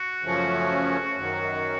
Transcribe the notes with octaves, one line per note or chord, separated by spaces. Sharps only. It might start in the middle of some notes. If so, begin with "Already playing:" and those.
Already playing: F#4
F#2 C#3 F3 A3 C#4
F#2 D#3 F#3